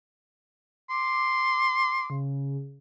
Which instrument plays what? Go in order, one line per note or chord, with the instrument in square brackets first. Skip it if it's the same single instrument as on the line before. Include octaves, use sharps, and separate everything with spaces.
[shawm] C6 [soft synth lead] D6
[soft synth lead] C#3